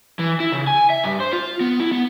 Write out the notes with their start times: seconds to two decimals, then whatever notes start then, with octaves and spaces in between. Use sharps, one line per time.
0.19 E3
0.40 E4
0.52 C#3
0.67 G#5
0.90 E5
1.04 G2
1.20 C5
1.33 F4
1.61 B3
1.80 E4
1.91 B3